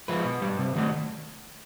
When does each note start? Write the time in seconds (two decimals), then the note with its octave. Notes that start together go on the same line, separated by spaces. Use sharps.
0.08 F3 G#3 B4
0.25 B2
0.42 G3
0.59 C3
0.76 D#3 F#3 A3